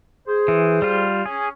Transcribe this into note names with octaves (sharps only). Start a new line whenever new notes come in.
G#4 C5
E3
G3 F4
C#4 G#4